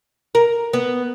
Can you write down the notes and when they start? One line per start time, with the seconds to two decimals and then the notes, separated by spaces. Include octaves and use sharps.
0.35 A#4
0.73 B3